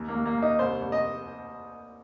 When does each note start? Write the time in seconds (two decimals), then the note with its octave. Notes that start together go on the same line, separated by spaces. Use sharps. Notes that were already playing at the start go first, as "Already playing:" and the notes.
Already playing: D#2
0.09 A#3
0.14 D#2
0.26 A#3
0.37 D#2
0.42 D#4
0.59 C2 C5
0.82 C2
0.92 D#5